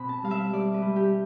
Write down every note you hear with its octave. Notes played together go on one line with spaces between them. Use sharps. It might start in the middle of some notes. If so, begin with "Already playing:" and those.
Already playing: B2 C4 B5
A5
G3 F5
E5
G3 D5
B4
G3
G4